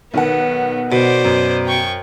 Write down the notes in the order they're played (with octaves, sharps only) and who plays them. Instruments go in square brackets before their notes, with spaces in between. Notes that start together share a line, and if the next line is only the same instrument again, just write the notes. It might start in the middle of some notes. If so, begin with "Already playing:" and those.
[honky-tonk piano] B1 D#3 F#5 [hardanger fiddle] B3
[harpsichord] B2 [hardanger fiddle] C5 D5
[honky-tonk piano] F#2
[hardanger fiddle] G5 C#6